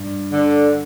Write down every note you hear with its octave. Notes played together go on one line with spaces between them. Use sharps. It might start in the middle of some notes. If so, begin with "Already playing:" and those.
Already playing: G2
D3